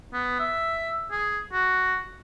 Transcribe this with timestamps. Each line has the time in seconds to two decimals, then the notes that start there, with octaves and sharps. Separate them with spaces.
0.14 B3
0.40 E5
1.11 G#4
1.53 F#4